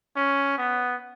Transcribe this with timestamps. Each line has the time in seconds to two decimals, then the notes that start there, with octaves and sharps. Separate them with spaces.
0.16 C#4
0.58 B3